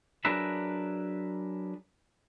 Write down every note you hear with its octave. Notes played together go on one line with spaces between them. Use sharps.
F#3 D4 G#4 A#4 B4 E5